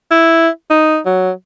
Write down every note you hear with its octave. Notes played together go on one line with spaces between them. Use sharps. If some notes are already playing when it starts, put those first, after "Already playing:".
E4
D#4
F#3